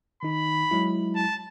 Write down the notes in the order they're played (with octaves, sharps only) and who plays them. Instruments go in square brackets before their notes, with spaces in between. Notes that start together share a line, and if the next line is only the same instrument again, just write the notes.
[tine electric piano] D#3 D#4 [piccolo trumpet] B5
[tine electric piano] F#3 G#3 E4
[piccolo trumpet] A5